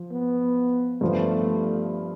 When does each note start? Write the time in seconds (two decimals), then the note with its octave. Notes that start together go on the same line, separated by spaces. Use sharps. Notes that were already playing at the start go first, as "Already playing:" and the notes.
Already playing: F3
0.11 B3
1.01 G2 F3 A3 B3